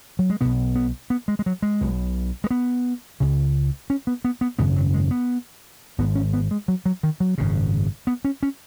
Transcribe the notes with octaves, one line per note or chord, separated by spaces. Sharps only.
F#3
G#3
B1 B2 B3
B3
B3
G#3
G#3
F#3
G#3
B1 B2
G#3
B3
C#2 C#3
C#4
B3
B3
B3
G#1 F#2 C#3 B3
F#3
G#3
B3
G#1 G#2 B3
C#4
B3
G#3
F#3
F#3
D#3
F#3
G#1 F#2 C#3
B3
C#4
C#4